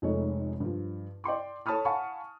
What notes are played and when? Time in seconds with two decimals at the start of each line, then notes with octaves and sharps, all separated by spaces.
0.02 F1 F2 G#3 A3 D#4 C#5
0.60 G2 F3
1.24 D5 G5 C6 D6
1.66 A4 C#5 A5 B5 D#6 F6
1.85 F5 F#5 G#5 A5 B5 C#6